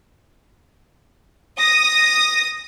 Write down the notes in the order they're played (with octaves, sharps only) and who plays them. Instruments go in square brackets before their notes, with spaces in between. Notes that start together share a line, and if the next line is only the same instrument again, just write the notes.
[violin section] D#6 [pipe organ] A#6